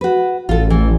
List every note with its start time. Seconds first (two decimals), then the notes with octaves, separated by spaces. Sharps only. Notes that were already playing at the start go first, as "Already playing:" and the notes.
0.01 F#4 B4
0.49 A1 F4 A4
0.70 E3